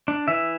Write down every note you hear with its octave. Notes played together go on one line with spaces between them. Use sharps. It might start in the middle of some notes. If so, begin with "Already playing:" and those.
D4
E3 E5